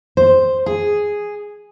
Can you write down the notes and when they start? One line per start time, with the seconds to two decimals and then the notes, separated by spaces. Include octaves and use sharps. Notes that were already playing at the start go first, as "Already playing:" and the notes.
0.17 C5
0.66 G#4